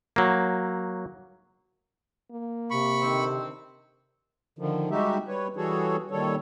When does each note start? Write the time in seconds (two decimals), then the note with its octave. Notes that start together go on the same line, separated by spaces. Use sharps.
0.16 F#3 A#3
2.31 A#3
2.71 C3 B5 C#6
3.02 D3 D#3 C4
4.59 D3 D#3 F3
4.91 G3 G#3 D#4 F#4 G4 E5
5.28 G3 B4 C#5
5.57 E3 G3 F#4 G#4 A4 C#5
6.11 A#2 D#3 G3 A4 C#5